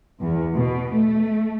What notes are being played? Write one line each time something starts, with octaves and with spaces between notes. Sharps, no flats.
E2
B2
A3